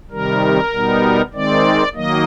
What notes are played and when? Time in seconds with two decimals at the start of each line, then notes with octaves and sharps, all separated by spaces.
0.10 C3 D#3 G3 A#4
0.71 B2 G3 B3 D#4
1.33 D#3 G#3 C4 D5
1.95 D#3 F#3 A#3 D#5